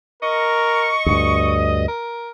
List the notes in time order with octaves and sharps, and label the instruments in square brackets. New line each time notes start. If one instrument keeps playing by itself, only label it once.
[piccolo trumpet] A#4 [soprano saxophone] D#5 [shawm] C#6
[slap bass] D2 G2 [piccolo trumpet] D#6
[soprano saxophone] A#4